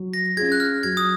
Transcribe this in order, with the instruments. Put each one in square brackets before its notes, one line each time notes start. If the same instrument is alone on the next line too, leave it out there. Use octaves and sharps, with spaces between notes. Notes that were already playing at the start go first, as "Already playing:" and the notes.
Already playing: [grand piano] F#3
[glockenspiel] A#6
[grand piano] C#4 F4 G#4 [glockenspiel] G#6
[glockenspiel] F#6
F6
[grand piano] F#3 [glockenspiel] G#6
[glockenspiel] D#6